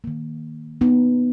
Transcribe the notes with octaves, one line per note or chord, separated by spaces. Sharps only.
D#3 A#3
B3 D#4